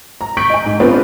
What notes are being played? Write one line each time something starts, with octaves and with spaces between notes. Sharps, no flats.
A#5
C#6 G6 B6 D7 F#7
D#5 G#5
G#2
B3 C4 D4 F4